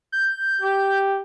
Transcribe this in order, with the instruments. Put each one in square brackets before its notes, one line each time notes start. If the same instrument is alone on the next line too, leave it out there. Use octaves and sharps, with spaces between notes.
[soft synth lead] G6
[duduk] G4